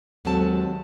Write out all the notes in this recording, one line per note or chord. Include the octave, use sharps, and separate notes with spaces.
D#2 F#3 G#3 C4 A4 A5